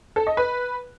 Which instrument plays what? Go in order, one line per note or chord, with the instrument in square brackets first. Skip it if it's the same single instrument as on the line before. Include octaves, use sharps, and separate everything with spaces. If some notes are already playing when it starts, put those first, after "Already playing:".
[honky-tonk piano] A4
D#5
B4